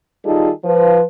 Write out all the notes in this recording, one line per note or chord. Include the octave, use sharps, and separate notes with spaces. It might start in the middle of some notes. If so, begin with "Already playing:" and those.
D#3 G3 D#4 F4 G#4 A4
F3 B4